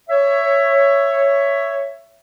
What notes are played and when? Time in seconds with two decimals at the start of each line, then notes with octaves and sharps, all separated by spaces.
0.09 C#5 E5